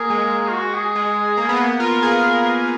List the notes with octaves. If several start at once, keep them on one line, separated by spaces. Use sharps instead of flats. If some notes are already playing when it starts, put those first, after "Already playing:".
Already playing: A#3 G#4
G#3
F4
F#4
G#4
G#3
A#3
B3
F4 A#4
G#4